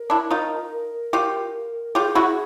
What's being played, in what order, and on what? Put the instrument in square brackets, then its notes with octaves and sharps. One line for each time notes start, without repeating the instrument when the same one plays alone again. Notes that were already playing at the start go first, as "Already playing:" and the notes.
Already playing: [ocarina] A#4
[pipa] D4 E4
D#4 F4
F4 G4
[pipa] F4 G4 [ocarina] G#4
[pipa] E4 F#4